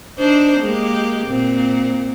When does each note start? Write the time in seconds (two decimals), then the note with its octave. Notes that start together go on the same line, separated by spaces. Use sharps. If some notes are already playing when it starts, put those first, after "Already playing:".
0.19 D4 D#4 C5
0.61 G#3 A#3 G4
1.27 A#2 C4